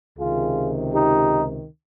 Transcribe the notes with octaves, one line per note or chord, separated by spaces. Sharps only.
C#2 C3 D#3 F4 G#4
D#4 G4